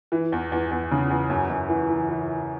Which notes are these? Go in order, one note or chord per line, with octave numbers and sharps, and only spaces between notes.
E3
E2
E2
E2
C#3
E2
F#2
F#2
E3
E3
E3
E3